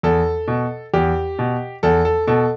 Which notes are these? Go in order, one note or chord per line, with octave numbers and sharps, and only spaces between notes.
E2 A4
B2
E2 G4
B2
E2 A4
A4
B2 A4